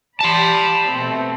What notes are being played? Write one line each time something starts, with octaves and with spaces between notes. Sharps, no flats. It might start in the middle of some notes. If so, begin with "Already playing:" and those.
G4 D5 A5 B5 C6
B2 A3 C4